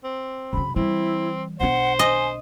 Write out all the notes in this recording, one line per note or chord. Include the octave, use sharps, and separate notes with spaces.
C4
F#2 C#3 B5
E3 G3 C4 E4
B1 D4 C5 F#5
D#5 G#5